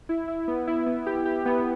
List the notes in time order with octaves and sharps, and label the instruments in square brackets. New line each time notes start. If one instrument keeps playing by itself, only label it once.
[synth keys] E4
E4
B3
E4
B3
G4
G4
B3